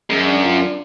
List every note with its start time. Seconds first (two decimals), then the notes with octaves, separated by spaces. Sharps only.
0.09 F#2 G#3
0.27 D4
0.43 F4
0.60 D4